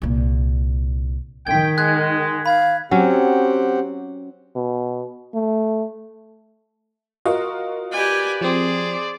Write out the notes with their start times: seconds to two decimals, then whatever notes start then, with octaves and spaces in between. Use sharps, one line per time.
0.02 C2 A#2
1.47 D#3 G5 G#6 B6
1.78 G#3 F#6 G#6
2.46 F5 B5 G#6
2.91 F#3 C4 C#4 G4 F#5
4.56 B2
5.34 A3
7.25 F4 F#4 A#4 D#5
7.92 G4 B4 D5 G#5
8.41 F3 C4 G#4 C5 D5